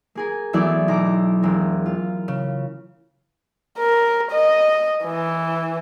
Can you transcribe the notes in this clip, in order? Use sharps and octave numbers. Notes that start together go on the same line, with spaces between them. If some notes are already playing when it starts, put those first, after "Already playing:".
A#3 G#4 A#4
E3 F#3 A3 B3 E4 D5
B1 A#5 D6
E1 A#4
F4
C#3
A#4
D#5
E3